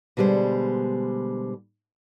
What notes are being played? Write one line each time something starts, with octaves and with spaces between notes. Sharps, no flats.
B2 D3 G3 G#3 C5